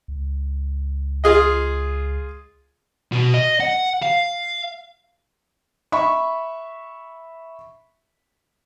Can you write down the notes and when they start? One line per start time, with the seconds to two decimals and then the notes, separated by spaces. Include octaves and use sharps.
0.08 C#2
1.24 F4 G#4 D#5
3.12 B2
3.34 D#5
3.60 F#5
4.03 F5
5.92 E5 B5 C#6